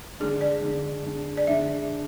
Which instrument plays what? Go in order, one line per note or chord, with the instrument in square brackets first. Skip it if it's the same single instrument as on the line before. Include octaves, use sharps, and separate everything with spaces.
[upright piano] D3 G#3 D4 [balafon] G#4
[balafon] D5
[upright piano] D3 G#3 D4
D3 G#3 D4
[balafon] D5
[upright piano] D3 G#3 D4 [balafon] E5